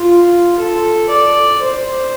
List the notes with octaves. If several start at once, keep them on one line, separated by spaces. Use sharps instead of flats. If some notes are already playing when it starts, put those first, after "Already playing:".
Already playing: F4
A4
D5
C5